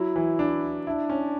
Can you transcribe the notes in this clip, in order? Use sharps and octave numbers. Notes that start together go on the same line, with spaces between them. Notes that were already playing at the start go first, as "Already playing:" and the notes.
Already playing: F#3 E4
E3
D4
D4 E4
C#4